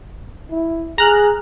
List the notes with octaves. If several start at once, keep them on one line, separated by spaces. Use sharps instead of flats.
E4
G#4 A#5 F6 F#6